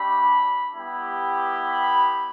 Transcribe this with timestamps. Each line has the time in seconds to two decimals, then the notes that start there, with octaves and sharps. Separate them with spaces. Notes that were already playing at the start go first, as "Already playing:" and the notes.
Already playing: A3 D4 G4 B5
0.75 G3 B3 E4 G4
1.68 B5